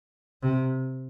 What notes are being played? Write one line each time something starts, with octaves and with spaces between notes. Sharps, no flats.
C3